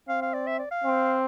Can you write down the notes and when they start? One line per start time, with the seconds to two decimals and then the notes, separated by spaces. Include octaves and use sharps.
0.09 C4 F5
0.22 F5
0.33 D5
0.47 E5
0.59 D5
0.71 F5
0.84 C4